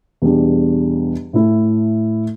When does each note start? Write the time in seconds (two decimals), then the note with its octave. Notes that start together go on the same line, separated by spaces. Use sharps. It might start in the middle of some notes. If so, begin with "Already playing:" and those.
0.22 E2 B2 G3 D4
1.33 A2 A3 E4